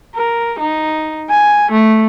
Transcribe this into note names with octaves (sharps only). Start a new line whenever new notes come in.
A#4
D#4
G#5
A3